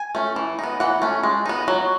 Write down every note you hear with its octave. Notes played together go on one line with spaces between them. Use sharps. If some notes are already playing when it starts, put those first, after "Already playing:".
Already playing: G#5
A3 C#4
E3
B3 D#4
E3 F#5
A3 C#4
G#3
B3 D#4
F#3